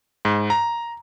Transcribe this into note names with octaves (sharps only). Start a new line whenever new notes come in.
G#2
A#5